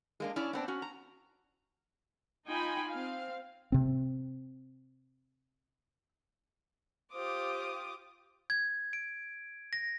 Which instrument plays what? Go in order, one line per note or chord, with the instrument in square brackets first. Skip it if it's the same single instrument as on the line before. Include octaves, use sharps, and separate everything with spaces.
[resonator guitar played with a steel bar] G#3 A#3 D4
C#4 D4 E4 C#5 D5
B3 C4 D4
C#4 F#4
A#5
[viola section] D#4 F4 G5 G#5 B5
C4 F5
[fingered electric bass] C3 C4
[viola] F4 G4 [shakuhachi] C5 [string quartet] D6 D#6
[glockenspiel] G#6
D7
A#6